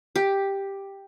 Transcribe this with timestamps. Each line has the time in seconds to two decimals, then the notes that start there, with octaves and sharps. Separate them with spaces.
0.16 G4